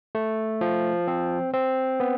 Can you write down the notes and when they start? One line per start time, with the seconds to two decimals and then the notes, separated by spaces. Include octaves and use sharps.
0.15 A3
0.61 F3
1.08 C4
1.54 C4
2.00 B3